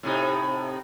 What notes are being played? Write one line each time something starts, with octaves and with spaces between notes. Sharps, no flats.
A2 C3 D#4